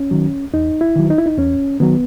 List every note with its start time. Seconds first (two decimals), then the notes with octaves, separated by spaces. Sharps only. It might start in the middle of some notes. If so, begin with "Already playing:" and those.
Already playing: C#4
0.11 D#3 F#3
0.53 E2 D#4
0.81 E4
0.96 D#3 F#3
1.10 D#4
1.18 E4
1.26 D#4
1.38 E2 C#4
1.80 D#3 F#3 B3